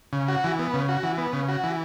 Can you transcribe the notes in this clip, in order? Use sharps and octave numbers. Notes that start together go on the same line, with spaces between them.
C#3
F#4
E3
B3
C#3
F#4
E3
B3
C#3
F#4
E3